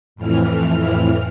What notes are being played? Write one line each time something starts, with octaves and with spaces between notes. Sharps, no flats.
F2 A2 E3 F6